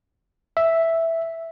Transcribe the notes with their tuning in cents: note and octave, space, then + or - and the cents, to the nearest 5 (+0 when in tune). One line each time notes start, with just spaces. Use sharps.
E5 +0